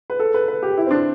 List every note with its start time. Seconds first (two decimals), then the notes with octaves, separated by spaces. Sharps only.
0.10 B4
0.20 A4
0.34 B4
0.48 B4
0.63 G4
0.77 E4
0.86 C4
0.91 D4